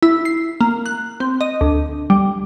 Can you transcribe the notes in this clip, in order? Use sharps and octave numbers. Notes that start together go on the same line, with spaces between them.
E4
C7
A#3
F#6
C4
D#5
D2
G3